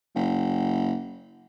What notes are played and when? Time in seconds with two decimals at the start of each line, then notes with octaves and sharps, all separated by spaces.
0.15 F#1